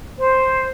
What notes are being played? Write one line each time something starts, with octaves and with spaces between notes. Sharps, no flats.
C5